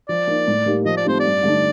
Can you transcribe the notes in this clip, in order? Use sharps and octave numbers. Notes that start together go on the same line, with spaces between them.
F3 D5
A#3 D#4
A2
G3 A#3 D#4 G4
F3 D#5
D5
A3 C4 D#4 G4 C5
G2 D5
D3 A3 D#4